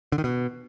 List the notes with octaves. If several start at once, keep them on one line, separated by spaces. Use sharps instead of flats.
D3
D#3
B2